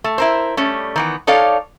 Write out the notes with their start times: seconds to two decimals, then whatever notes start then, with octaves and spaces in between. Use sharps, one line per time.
0.04 A3
0.18 E4 A#4 C5
0.57 G3 A3 C#4
0.96 D#3 E3 B3
1.27 D#4 A4 C#5 D5 F5